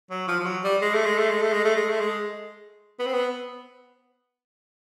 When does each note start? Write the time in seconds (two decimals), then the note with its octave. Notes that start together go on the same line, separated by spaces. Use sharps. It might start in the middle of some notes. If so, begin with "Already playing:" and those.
0.10 F#3
0.28 F3
0.40 F3
0.46 F#3
0.64 G3
0.82 G#3
0.94 A3
1.05 G#3
1.18 A3
1.30 G#3
1.42 A3
1.53 G#3
1.64 A3
1.76 G#3
1.89 A3
2.00 G#3
2.99 B3
3.06 C4
3.14 B3